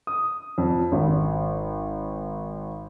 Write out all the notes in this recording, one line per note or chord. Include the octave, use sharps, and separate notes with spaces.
D#6
F2
G#1